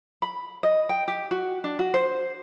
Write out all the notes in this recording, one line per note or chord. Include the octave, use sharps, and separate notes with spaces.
B5
D#5
G5
G4
F#4
D4
F#4
C5